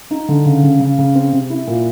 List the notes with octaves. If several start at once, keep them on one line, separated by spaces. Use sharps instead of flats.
D#4
D3
C#3
C#3
C#3
C#3
C4
C3
E4
A#2